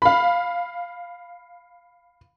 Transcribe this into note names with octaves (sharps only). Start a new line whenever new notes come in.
F5 B5